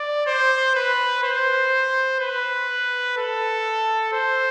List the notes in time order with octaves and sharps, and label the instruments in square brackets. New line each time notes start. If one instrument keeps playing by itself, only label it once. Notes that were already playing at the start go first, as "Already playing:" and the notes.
Already playing: [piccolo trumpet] D5
C5
B4
C5
B4
A4
C5